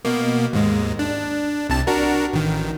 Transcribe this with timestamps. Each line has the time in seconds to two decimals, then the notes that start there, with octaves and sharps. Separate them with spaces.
0.05 B2 A#3
0.53 D#2 G#2 G#3
0.99 D4
1.69 C2 C3 A5
1.87 D4 F#4 A#4
2.33 A1 D#3